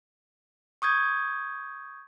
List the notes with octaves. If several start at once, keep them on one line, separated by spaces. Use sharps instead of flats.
C#6 D#6 G6 G#6